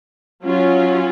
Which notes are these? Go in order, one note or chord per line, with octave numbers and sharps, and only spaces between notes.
F#3 C#4 F4